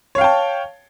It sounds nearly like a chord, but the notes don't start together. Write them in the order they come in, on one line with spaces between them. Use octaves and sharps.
C#5 F5 G5 A5